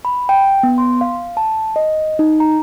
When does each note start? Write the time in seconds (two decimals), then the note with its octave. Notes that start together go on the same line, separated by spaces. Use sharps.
0.05 B5
0.29 G5
0.63 B3
0.78 C6
1.01 F5
1.37 A5
1.76 D#5
2.19 D#4
2.40 A#5